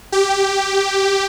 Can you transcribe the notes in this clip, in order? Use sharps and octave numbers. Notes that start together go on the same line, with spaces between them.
G4